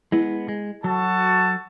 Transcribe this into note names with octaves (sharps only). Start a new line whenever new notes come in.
G#3 B3 E4
G#3
F#3 F#4 A4 A5